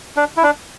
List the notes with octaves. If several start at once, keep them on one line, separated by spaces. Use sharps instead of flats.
D4
E4
D4